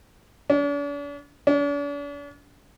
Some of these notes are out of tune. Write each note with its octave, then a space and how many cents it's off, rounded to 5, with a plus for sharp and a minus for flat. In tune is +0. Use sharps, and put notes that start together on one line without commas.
D4 -45
D4 -45